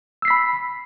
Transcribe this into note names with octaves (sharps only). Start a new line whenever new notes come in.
B5 E6 B6 C7